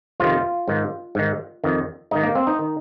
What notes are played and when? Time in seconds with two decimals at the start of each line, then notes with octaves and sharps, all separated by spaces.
0.20 F2 C3 D#3 F4
0.68 G#2 D#3
1.15 G#2 D#3
1.64 F2 D#3
2.11 G#2 D#3 D#4
2.23 A#3
2.35 C4
2.47 D#4
2.59 D#3